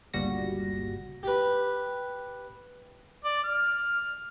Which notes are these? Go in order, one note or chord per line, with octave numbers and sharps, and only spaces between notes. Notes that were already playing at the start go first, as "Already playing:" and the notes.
G1 C#2 A#2 G3 F#4 A#6
G4 B4
D5
F6